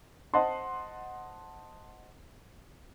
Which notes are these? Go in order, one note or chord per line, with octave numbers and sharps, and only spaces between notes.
C5 D#5 F#5 A5 C6